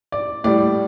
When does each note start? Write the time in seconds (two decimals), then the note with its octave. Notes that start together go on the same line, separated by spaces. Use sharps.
0.12 D5
0.44 A2 G3 D5